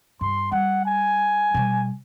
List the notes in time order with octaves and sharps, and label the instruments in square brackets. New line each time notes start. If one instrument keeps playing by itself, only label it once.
[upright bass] G2 [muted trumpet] C6
[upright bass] G3 [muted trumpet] F#5
[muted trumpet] G#5
[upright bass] B2 G3